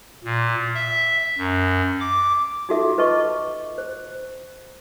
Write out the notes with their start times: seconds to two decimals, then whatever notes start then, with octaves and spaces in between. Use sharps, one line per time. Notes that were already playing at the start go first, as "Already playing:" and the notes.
0.24 A#2
0.75 E5
1.38 F#2
2.00 D6
2.69 D#4 F4 F#4 A4 E5 D6
2.98 F4 B4 D#5 A5 C#6 D6
3.78 C5